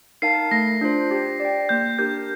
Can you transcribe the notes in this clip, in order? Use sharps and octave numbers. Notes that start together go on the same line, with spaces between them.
D#4 A#4 F5 A5 C7
A3 A#6
D4 F4 C5
G4
D5
G5
A#3 G6
D4 G4 A#4 G6